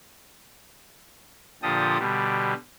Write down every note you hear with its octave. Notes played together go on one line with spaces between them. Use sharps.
A#2 D3 F3 G4 A4 D#6
B2 D3 G3